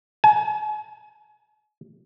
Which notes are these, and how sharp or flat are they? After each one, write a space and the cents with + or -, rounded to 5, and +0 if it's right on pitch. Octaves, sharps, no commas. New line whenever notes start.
G#5 +40